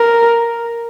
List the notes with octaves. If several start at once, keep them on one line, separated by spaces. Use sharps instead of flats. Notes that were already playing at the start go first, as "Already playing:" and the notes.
Already playing: A#4